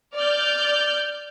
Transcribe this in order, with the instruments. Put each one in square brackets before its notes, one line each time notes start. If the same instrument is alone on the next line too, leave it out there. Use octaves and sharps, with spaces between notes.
[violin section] D5 F6 G6